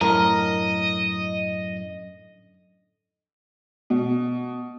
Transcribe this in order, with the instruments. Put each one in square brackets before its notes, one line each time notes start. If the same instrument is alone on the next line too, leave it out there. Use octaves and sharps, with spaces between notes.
[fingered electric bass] F#2 A2 [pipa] D3 A#4 [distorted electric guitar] D#5
[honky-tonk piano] B2